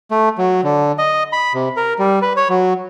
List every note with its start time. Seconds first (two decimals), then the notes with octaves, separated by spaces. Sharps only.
0.11 A3
0.38 F#3
0.64 D3
0.98 D#5
1.33 B5
1.54 C3
1.77 A#4
1.99 G3
2.22 B4
2.37 C#5
2.49 F#3